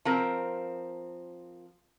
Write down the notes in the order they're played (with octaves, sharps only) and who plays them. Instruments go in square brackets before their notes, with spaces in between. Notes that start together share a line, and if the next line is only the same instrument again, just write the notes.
[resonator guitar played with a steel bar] F3 C4 A#4